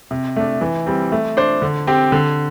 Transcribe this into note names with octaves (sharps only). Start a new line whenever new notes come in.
C3
A3 D4
E3
G3 C4
A3
D4 C5
D3
C4 G4
D3